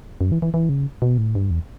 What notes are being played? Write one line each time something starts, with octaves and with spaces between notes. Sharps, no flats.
F#2
E3
E3
E3
C#3
B2
A2
G2
E2